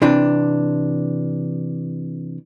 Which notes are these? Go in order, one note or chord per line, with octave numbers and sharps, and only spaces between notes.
C3 E3 D4